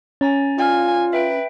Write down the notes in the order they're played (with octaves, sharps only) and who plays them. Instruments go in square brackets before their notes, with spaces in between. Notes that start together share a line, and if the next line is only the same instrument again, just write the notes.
[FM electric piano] C#4 [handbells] G#5 A#5 A6
[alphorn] F4 [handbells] D5 F5 F6 [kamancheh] G#5
[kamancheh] B4 [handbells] E5 G5 D7